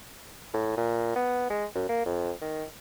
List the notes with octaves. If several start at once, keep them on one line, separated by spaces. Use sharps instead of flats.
A2
A#2
B3
G#3
F#2
A#3
F2
D#3